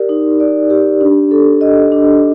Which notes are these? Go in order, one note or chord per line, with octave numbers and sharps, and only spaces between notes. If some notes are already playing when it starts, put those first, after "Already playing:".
Already playing: G4 A#4 D5
D#4
D5
G4
D4
A4
D#5
D4